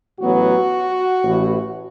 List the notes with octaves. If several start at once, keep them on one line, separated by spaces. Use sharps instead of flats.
A1 A2 F#3 B3 F#4
A1 A2 E3